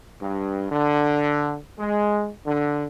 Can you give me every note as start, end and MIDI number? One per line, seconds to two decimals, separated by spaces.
0.22 0.69 43
0.71 1.58 50
1.79 2.31 56
2.46 2.86 50